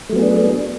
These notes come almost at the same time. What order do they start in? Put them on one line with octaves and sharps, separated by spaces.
A3 F#3 B3 G#4 D4